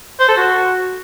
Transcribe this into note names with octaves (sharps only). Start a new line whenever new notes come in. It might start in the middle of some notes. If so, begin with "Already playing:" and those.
C5
A4
F#4